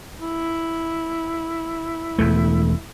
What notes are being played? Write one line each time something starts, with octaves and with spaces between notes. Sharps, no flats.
E4
E1 E2 A3